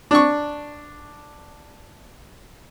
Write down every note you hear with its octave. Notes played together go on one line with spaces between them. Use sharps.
D4 C#6